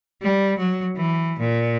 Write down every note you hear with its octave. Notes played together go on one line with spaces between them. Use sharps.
G3
F#3
E3
A#2